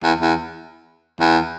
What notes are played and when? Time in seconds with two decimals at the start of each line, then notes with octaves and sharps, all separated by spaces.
0.03 E2
0.21 E2
1.20 E2